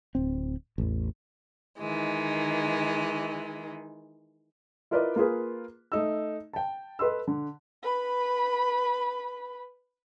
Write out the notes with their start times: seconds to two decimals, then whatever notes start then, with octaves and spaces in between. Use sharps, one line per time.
0.15 D1 C4
0.78 A1 E2
1.78 D#3 E3 G#3
4.91 E4 F4 A#4 B4 D5 D#5
5.16 A#3 F4 G#4 B4
5.92 A3 D#4 E6
6.53 G5 A5
6.99 A4 B4 D#5 C6 E6
7.27 D3
7.83 B4 B5